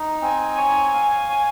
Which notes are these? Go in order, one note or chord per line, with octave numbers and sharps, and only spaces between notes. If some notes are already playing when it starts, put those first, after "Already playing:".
Already playing: D#4
C4 G#5
C#5
F5
C#5